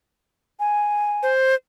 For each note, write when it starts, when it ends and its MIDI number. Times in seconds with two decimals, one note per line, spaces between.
0.60 1.29 80
1.23 1.55 72